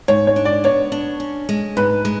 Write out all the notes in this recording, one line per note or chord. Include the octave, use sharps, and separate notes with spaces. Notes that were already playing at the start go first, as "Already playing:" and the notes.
G#2 C#5
C#5
D4
D5
B3 C#5
D4
C#4
G#3
G#2 B4
G#3